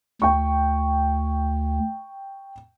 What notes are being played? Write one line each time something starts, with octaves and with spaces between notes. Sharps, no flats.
D2 G5 C#6